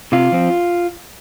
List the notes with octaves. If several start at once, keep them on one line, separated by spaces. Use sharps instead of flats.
C3 F4
F3 C4